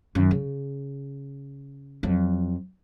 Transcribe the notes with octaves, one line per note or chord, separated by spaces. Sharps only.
F#2 D#3
C#3
F2 F#3